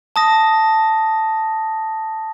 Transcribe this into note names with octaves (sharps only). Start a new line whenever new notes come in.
A5 D#6 A#6